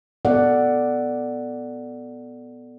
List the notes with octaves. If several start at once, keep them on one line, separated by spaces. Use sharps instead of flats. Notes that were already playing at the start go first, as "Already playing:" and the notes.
B3 A4 D5 F#5